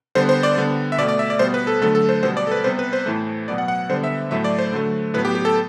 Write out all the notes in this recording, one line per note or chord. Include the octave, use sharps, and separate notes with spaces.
D3 G3 B3 C5
C5
D5
D3 G3 B3
E5
B2 A3 D5
D5
E5
D5
B2 G3 B3 C5
B4
A4
D3 F#3 A3 A4
A4
C5
B2 G3 B3 C5
D5
A4
B4
C3 G3 B3 C5
B4
C5
A2 E3 A3
B2 F#3 B3 D5
F#5
F#5
D3 G3 B3 C5
E5
A2 F#3 A3 E5
D5
C5
D3 F#3 A3
A2 F#3 B3 B4
G4
G4
A4